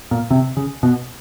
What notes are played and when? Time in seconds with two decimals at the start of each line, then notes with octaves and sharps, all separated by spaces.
0.11 A#2
0.31 C3
0.57 C#3
0.83 B2